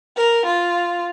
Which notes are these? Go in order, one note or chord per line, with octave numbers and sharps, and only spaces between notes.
A#4
F4